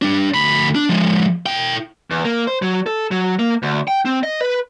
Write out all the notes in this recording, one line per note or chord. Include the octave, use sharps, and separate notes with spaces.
G3 D4
D2 B5
D4
F3 G#3
E4 G5
E2
A#3
C5
F#3
A4
F#3
A#3
D2
G5
C4
D#5
B4